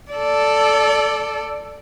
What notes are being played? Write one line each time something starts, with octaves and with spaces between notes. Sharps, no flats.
A4 D5